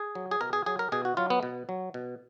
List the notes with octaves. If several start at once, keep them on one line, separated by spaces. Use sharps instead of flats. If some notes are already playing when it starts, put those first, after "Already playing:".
Already playing: G#4
F#3
G#4
B2 A#4
G#4
F#3 G#4
A#4
B2 G#4
F#4
F#3 F4
B3
B2
F#3
B2